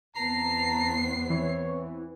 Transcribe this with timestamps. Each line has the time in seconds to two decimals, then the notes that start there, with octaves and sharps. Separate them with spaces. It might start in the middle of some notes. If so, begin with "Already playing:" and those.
0.16 E2 B3 C4 A5 A#5 C7
1.30 E3 C#5